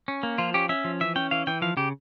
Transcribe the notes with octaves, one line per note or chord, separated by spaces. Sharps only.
C#4
A#3
F3 F4
C#4 G4
C#4 E5
F3
E3 E5
C#4 G5
E3 F5
E3 G5
F3 F5
C#3 G4